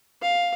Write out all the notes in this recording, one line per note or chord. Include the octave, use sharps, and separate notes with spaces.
F5